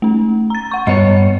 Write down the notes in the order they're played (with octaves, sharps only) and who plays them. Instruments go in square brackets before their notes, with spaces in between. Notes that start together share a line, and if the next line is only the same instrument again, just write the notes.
[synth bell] A3 C#4
A#5 A6
F#5 C#6
[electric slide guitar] G2 B3 C#5 [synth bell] D#5